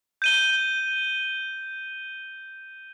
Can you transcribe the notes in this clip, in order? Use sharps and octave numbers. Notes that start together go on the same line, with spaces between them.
G6 D#7 G7